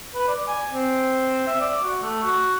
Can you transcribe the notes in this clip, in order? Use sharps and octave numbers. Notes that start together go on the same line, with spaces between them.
B4
D5
G#5
C4
E5
D5
F#4
A3
F#4